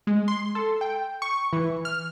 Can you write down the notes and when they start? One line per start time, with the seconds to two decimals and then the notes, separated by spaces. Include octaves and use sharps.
0.07 G#3
0.28 C6
0.55 A4
0.81 G5
1.22 C#6
1.53 E3
1.85 F6